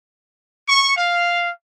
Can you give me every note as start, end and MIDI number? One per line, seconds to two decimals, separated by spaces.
0.68 0.94 85
0.97 1.50 77